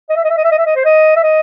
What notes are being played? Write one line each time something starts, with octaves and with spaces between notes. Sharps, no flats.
D#5
E5
D#5
E5
D#5
E5
D#5
E5
D#5
C5
D#5
E5
D#5